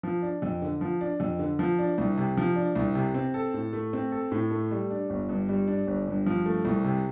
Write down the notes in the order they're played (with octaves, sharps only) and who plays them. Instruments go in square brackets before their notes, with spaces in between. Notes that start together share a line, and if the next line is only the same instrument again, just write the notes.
[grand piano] F3
D4
F2
D3
F3
D4
F2
D3
F3
D4
C2
C3
F3
D4
C2
C3
C4
A4
A2
A3
C4
A4
A2
A3
G3
D4
G1
G2
G3
D4
G1
G2
F3
A3
C2
C3